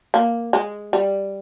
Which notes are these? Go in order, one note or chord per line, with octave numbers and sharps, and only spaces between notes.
A#3
G#3
G3